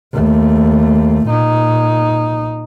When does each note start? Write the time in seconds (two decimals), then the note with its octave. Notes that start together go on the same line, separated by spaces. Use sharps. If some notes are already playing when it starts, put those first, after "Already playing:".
0.13 D#2 A3
1.26 A#2 D#4